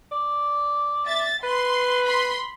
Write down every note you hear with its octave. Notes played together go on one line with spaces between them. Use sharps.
D5
E5 A6
B4 C6
B5 C6